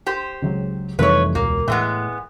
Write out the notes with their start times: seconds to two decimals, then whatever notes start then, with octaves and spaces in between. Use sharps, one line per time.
0.06 G4 C5
0.42 C#2 C#3 F#3
0.99 F2 C3 E3 G3 A3 D#4 B4 C#5
1.35 E1 C#2 A#3
1.68 A2 E3 G#3 B3 G5